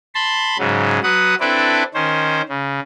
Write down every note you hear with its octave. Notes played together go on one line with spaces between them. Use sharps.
A5 B5 C6
G#2 C#3 F#3
F#3 B4 F#5 D#6
C4 D4 E4 A4 B4 D5
D#3 C#4 C5
C#3